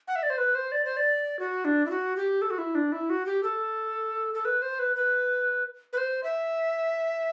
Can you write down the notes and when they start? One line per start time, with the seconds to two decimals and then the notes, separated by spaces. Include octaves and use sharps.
0.08 F#5
0.16 E5
0.23 D5
0.30 C5
0.38 B4
0.55 C5
0.72 D5
0.85 C5
0.97 D5
1.39 F#4
1.65 D4
1.86 E4
1.90 F#4
2.16 G4
2.42 A4
2.50 F#4
2.58 E4
2.75 D4
2.92 E4
3.10 F#4
3.26 G4
3.43 A4
4.34 A4
4.45 B4
4.62 C5
4.79 B4
4.96 B4
5.93 B4
5.97 C5
6.24 E5